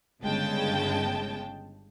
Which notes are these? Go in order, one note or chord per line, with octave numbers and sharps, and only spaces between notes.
G1 C#3 G#3 G5 A5